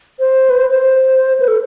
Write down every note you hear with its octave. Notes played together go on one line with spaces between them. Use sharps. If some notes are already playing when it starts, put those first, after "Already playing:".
C5
B4
C5
C5
B4
A4